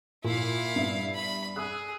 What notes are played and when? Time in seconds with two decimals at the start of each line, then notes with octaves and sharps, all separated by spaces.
0.24 A#2 E4 F5
0.76 G2 B3 E5
1.15 B5
1.56 G#4 D#6 E6 F#6